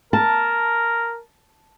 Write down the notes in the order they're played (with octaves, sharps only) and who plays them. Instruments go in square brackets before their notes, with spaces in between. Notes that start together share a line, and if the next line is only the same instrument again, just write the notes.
[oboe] A#4 [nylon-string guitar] A5